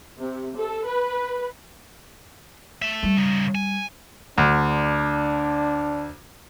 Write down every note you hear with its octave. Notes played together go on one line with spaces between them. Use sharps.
C3
A4
B4
A3 E5
G3
C#3 D#4
G#5
D2 D4